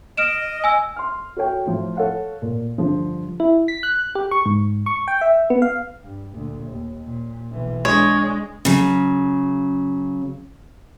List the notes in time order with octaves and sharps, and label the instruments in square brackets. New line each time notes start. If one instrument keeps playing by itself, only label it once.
[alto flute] D#5 [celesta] F6 D7 E7
[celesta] G#5 E6
[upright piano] C6 F6
F#4 A4 C#5 G5
A2 F3
A4 C#5 F5 F#5
A#2
G2 D3 F3
[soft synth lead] E4
B6
F#6
G4
C#6
G#2
C#6
G5
E5
B3
F5
[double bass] G2
D2 A#2
D#2
A#2
B1 E3
[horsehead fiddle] G#3 [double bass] D4 [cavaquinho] C#5
[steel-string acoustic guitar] C#3 F#3